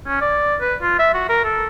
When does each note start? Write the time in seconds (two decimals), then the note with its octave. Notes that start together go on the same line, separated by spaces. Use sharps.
0.07 C#4
0.21 D5
0.61 B4
0.82 F4
0.99 E5
1.14 F#4
1.29 A#4
1.44 A4